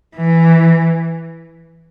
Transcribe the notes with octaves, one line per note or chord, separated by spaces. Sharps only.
E3